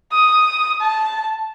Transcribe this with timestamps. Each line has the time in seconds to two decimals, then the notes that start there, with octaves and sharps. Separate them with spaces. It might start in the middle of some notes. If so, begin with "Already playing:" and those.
0.11 D#6
0.80 A5